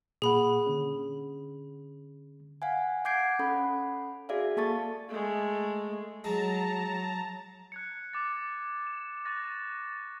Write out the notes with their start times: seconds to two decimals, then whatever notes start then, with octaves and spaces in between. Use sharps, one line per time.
0.22 A#2 A#3 G#4 F#5 B5
0.66 D3 C#4
2.62 F5 F#5 G#5
3.05 F#5 D6 G6 G#6 C7 D7
3.39 C#4 A4 F#5 B5
4.29 F#4 G#4 D5 E5 F5
4.57 A#3 A4 A5 C#6 A6
5.09 G#3 A3
6.24 F#3 G#3 A5 A#5
7.72 F#6 G#6 C#7
8.13 D6 A6
8.87 E7
9.25 C#6 F#6 A6 A#6